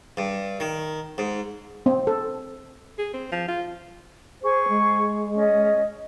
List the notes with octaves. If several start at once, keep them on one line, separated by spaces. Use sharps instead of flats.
G2
D#3
G#2
C4
A4
G#4
C4
F3
F4
G#4 C5 C#6
G#3
C#4 D#5